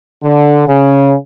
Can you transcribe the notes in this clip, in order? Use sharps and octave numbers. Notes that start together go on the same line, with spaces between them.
D3
C#3